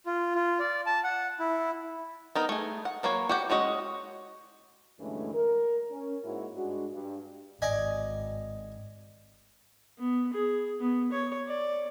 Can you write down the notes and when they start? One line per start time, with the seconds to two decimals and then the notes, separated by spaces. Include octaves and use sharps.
0.06 F4
0.35 F4
0.59 D5
0.86 A5
1.04 F#5
1.40 E4
2.35 B3 D#4 A#4
2.49 A3 G#4
2.85 F#5
3.03 F#3 A#3 B4 C#5
3.29 F#4 G4 F#5
3.50 G#3 C#4 F#4 D#5
5.00 D2 G2 E3 G#3 A3 C#4
5.34 A#4
5.91 C#4
6.23 G#2 A#3 E4 F#4 C#5
6.56 G2 G#3 D4 F#4
6.93 G2
7.62 G#1 D5 D#5 G#5
9.99 B3
10.33 G#4
10.80 B3
11.12 C#5
11.47 D5